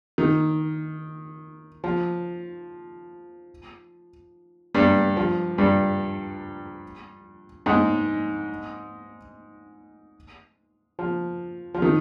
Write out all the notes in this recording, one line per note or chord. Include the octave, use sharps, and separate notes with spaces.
D#3
F3
G2 G3
F3
G2 G3
G#2 G#3
F3
F3
D#3